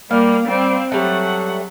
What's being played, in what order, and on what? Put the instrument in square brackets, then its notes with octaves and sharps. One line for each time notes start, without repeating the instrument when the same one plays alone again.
[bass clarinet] G3 [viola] A#3 [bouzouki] F5
[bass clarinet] G3 [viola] C4
[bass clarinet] F#3 [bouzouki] G3 A3 [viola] F#5